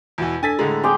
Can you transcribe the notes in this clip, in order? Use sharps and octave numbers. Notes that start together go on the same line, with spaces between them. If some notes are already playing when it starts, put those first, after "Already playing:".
E2 B2 E3
D4 A4 G#5 A6 B6
A2 D3 G#3 A#5
G4 G#4 G5 C6